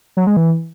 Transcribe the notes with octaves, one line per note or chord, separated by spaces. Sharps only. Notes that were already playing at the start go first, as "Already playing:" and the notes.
F#3
G#3
E3